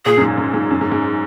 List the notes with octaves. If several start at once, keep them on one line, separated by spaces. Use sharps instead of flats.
A#2 G#4
F#2
G#2
G#2
G#2
F#2
G#2
G#2